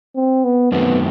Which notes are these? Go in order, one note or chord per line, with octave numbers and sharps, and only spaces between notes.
C4
B3
F#2 D#3 F#3 A3 B3 C4